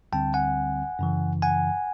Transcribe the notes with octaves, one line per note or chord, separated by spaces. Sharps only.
D2 D3 G3 C4 G5 A5
F#5 G#5
F#2 C#3 E3
F#5 G#5